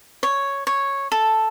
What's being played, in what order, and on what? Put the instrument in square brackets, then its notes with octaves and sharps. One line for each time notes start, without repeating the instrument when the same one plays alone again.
[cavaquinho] C#5
C#5
A4